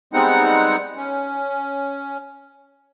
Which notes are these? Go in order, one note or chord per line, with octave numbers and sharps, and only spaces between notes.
G3 G#3 B3 C4 D#4 F#5
C#4